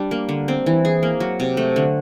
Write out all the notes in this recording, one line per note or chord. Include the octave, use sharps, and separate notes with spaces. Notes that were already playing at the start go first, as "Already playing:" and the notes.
Already playing: G3 D4
A#3
D3
C4
E3
G#4
A#3
F#3
C3
A3
D3